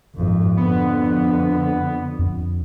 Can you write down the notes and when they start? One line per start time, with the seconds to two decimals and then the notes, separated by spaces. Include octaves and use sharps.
0.15 G#1 F2
0.57 F2 D3 B3
2.19 F2